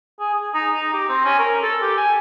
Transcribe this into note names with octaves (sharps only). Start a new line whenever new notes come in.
G#4
G#4
D#4
D#4
G4
C4
C#4
A#4
A4
G4
G#5